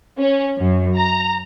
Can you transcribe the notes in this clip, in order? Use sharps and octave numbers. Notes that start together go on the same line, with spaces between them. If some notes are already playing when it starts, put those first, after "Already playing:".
C#4
F#2
A#5